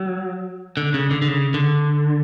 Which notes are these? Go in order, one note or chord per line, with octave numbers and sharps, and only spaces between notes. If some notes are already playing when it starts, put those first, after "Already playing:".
Already playing: F#3
D3
C#3
D3
D3
C#3
D3